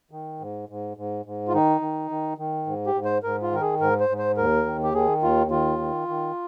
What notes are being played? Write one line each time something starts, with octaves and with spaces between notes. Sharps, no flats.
D#3
G#2
G#2
G#2
G#2
F4
D#3 D#4
D#3
D#3
D#3
G#2
G4
G#2
C5
G#2 A#4
F4
D#3 A#4
G#4
G#2 A#4
C5
G#2
C5
D#2 A#4
D#3
G4
D#3 G#4
D#2 F4
D#3 F4
D#3
D#3